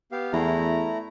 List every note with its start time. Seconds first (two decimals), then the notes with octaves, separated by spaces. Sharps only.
0.12 B3 G4 F5
0.33 E2 A3 E4 A#5